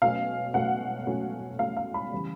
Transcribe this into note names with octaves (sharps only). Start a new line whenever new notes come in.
B2 F#3 A3 C#4 F5
B2 F#3 A3 C#4 F#5
B2 F#3 A3 C#4
B2 F#3 A3 C#4 F5
F5
B5
C#3 E3 G3